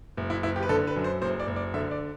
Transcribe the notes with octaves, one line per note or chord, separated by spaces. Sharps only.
F#1
E4
F#1 E4
G4
B4
D3 A4
B4
F#2
C5
F#1 C5
D5
F#1
D5
D3 E5
D5